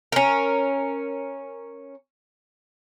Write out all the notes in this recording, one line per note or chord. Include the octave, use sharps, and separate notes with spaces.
C#4 A#4